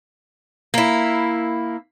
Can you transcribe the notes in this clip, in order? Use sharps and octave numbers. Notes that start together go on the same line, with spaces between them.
A#3 E4